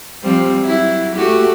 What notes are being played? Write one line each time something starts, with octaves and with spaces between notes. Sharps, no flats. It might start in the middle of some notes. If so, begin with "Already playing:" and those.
F3 G3 C4
F#3 E4
A3 F#4 G4